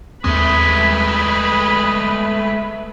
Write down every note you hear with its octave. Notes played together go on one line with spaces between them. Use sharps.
D#2 G#3 A3 C4 B4